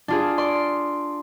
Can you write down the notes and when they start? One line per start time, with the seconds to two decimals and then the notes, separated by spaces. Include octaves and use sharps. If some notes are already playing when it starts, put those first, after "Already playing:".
0.08 D4 F4 G#4
0.38 D5 C6